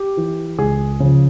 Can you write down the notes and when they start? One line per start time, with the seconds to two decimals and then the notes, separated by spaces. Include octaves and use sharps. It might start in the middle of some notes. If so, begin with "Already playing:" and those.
Already playing: G4
0.17 E3
0.58 C#2 G#4
1.00 C#3 F3